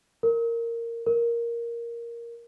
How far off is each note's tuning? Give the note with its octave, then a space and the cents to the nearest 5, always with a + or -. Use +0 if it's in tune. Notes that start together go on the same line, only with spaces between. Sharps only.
A#4 -10
A#4 +5